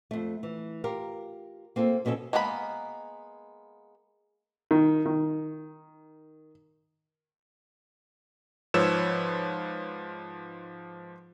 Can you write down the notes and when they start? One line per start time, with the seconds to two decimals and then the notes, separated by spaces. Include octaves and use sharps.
0.11 F2 A3
0.43 E3
0.84 F4 G4 A#4
1.76 A#3 C4 F4 A4
2.05 F2 B2 C#4 F4 A4
2.33 G#3 A#3 B3 G#4 B5
4.71 D#3
5.06 D#3
8.74 G#2 F3 B4 C#5 E6 E7